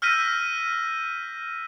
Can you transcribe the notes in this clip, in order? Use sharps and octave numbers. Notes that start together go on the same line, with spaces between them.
E6 F6 G6 A#6 B6 D#7